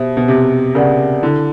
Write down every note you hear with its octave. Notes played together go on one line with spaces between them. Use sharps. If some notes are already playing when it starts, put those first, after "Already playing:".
Already playing: B2 G4 C5 E5
B2
C3 G4
C#3 A#4 D5 F#5
D3 E4